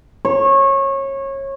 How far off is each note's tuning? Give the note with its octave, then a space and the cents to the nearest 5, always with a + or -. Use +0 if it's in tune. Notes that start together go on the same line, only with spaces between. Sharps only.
C#5 -25